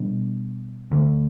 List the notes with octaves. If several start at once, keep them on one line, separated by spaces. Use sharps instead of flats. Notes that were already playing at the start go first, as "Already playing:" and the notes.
Already playing: B2 G3 B3 D4
D2 D3 A3